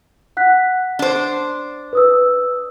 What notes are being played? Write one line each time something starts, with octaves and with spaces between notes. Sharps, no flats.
F#5 F#6 B6
D4 C5
B4 D#6 E6